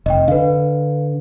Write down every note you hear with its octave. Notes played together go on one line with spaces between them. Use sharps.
F1 D#5 G5
D3 B4 F5